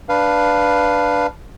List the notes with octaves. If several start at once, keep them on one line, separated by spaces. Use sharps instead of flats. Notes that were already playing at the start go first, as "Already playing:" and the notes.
D4 B4 F5